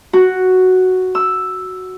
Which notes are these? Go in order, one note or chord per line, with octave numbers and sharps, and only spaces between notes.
F#4
E6